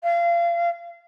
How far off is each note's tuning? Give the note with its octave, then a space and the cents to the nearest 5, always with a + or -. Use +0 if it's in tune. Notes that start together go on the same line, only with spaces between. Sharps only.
F5 -30